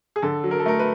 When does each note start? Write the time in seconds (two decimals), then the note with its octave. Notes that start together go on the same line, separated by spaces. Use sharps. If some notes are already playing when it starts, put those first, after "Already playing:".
0.16 G#4
0.22 D3 A4
0.44 F#3
0.51 A#4
0.60 A4
0.66 A3 A#4
0.79 B4